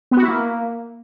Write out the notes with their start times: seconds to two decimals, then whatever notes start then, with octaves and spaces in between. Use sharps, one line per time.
0.11 B3
0.17 F#4
0.23 E4
0.28 A#3